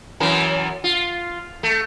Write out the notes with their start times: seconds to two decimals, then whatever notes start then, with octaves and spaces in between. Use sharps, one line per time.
0.20 F#2 E3 A#4
0.84 F4
1.63 A3